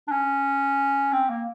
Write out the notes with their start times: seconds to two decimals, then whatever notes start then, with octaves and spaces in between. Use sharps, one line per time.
0.08 D4
0.12 C#4
1.13 C4
1.30 A#3